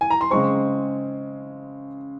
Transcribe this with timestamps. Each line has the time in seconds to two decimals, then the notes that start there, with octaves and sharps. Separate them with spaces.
0.01 G#5
0.10 A#5
0.21 C6
0.30 C#3 G#3 C4 C#6